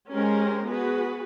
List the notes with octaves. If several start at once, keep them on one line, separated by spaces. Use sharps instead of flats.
G#3 C#4 G4 A#4 C5
B3 F#4 G#4 B4